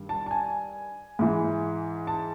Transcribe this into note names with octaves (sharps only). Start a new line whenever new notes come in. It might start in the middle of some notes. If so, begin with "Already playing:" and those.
Already playing: G2 D#3
A5
A5
G#5
G#2 E3
A5